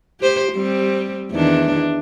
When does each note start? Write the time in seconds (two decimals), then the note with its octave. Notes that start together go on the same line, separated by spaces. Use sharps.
0.20 G4 C5
0.53 G3 C4
1.32 E2 D#3 D4